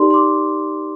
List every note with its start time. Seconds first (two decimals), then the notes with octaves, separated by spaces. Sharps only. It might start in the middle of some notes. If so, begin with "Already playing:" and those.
Already playing: D#4 G4 A#4 D5 C6
0.11 C6
0.14 D6